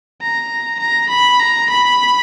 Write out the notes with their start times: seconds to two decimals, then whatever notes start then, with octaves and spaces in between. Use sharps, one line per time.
0.22 A#5
0.80 A#5
1.10 B5
1.40 A#5
1.70 B5